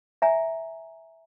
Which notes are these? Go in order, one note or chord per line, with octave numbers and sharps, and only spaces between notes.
E5 G#5 A#5